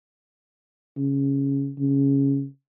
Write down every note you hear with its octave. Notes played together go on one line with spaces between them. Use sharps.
C#3
C#3